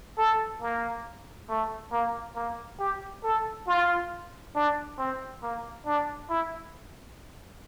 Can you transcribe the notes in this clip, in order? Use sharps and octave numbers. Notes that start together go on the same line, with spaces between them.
A4
A#3
A3
A#3
A#3
G4
A4
F4
D4
C4
A#3
D4
E4